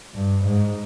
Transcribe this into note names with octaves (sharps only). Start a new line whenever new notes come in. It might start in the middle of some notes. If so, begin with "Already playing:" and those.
G2
G#2